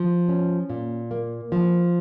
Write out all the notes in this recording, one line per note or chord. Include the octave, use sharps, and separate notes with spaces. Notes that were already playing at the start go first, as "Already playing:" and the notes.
Already playing: F3
C#4
A#2
A#3
F3